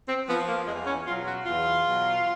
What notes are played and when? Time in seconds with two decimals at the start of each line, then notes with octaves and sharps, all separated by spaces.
0.08 C4
0.27 F3 B3
0.47 A#3
0.67 E2 G#3
0.86 C#4
1.07 B2 F#3 F4
1.27 F#4
1.45 E2 F4
1.85 B2 F#3